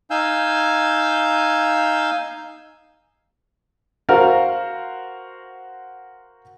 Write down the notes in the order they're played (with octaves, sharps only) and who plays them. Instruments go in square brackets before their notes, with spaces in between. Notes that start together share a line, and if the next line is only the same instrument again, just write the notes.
[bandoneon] D#4 F5 G#5 E6 G6
[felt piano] F#4 A#4 C5 F5